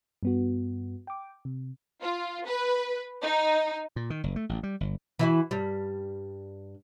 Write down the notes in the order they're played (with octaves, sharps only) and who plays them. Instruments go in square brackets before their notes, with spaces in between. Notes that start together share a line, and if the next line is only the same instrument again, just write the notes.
[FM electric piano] G2 B3 F#4
G5 D6
C3
[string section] F4
B4
D#4
[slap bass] A#2
D#3
F#1
A3
A1
G3
G1
[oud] E3 E4 F#4
G2 G3